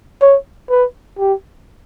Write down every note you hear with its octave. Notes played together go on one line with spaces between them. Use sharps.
C#5
B4
G4